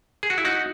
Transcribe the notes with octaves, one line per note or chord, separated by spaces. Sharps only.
G#4
F#4
E4
D#4 F#4